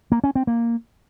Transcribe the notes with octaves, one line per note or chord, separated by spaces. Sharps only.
A#3
C#4
C4
A#3